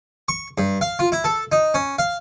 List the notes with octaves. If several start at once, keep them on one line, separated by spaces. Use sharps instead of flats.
C#6
G2
F5
F4
E4
A4
D#4
C#4
F5